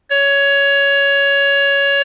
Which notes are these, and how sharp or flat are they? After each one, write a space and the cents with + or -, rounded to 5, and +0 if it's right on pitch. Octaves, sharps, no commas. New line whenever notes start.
C#5 +15